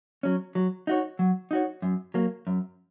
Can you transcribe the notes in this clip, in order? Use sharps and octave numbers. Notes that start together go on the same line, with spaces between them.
F#3 C#4
F#3
D#4 F#4 C#5
F#3
D#4 F#4 C#5
F#2
F#3 A#3
F#2